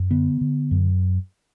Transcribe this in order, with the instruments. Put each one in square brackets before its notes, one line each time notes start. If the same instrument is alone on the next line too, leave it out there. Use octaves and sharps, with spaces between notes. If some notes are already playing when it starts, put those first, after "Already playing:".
Already playing: [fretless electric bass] F#2
D3 B3
D3
F#2